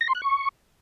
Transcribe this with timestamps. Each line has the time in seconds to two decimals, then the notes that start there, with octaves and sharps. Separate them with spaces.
0.01 A#6
0.08 C6
0.15 F#6
0.22 C#6